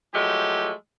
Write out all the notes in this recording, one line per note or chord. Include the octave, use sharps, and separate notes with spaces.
F3 F#3 G#3 A3 G4